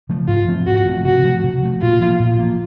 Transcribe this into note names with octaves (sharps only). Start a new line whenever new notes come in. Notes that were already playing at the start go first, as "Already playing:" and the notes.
C#3 F3 A3
G#2 F4
F3 A3 C4
G#2 F#4
F3 A3 C4
C3 F#4
F3 A3
C3
F3 A3
A#2 F4
F3 A#3
A#2
F3 A#3